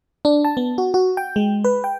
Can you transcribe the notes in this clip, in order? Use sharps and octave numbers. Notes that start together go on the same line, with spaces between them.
D4
A5
B3
F#4
F#4
G5
G#3
B4
G5